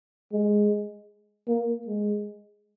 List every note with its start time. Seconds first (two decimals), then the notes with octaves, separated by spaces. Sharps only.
0.32 G#3
1.48 A#3
1.87 G#3